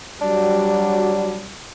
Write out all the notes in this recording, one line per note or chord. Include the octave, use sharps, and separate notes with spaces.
F#3 G3 D4